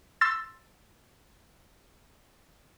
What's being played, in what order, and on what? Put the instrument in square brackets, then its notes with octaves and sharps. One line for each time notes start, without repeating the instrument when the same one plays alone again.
[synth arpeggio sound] C6 E6 A6